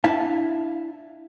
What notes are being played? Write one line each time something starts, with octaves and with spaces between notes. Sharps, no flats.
D4 E4 E5 F5 A5